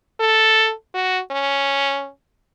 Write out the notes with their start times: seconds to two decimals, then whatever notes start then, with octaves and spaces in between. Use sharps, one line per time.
0.20 A4
0.94 F#4
1.31 C#4